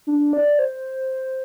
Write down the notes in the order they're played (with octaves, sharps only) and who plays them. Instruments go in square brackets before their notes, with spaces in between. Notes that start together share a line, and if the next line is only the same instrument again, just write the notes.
[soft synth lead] D4
D5
C5